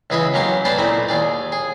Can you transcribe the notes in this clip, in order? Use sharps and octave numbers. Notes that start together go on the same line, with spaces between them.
C#2 E3 G#4 B4 D#5 E5
F#3 A#3 C#4 G4 C6 C#6
C#4 D4 B4 C5 D5 C6
A#2 A3 C4 D#4 E4
D#2 G#4 D5
G#4